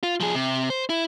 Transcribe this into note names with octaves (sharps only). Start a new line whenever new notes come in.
F4
F3 G#4
C3
C5
E4